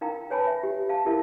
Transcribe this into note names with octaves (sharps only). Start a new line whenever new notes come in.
D#4 A#4 F5 G5 A#5
B4 C#5 G#5 A5 B5
E5
G4
F5 A5
E4 F4 G4 A#4 E5 A5